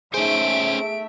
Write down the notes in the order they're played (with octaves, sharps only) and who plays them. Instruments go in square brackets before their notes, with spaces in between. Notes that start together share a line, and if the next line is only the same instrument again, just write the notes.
[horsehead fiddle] A3 E5 [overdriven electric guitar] C#4 C5 [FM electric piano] D#4 G#4 [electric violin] D7